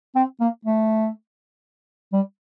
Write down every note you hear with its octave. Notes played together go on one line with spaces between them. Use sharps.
C4
A#3
A3
G3